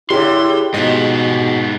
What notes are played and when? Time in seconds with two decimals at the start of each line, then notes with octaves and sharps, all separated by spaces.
0.10 A2 D3 E4 G4 G#4 C#5 C6
0.74 G#2 B2 F3 B3 D#5